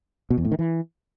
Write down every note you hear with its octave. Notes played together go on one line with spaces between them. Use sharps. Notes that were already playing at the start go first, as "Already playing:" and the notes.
B2
E2
A2
D#3
E3